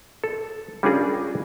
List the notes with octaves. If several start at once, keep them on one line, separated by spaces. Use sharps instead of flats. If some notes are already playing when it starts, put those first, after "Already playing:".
A4
G3 C#4 D4 F4 G#4 A#4